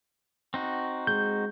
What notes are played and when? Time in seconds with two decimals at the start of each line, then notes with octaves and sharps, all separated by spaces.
0.54 C4 D#4 F#4
1.07 G#3 G6